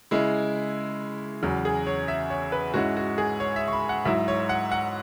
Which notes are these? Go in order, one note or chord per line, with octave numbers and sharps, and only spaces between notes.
C#3 G#3 E4
E2 C#3 F#3
G#4
C#5
E5
C#5
B4
G#2 G#3 C#4 E4 F#4
F#4
G#4
C#5
E5
C#6
B5
F#5
G#2 F#3 E4 E5
C#5
F#5
F#5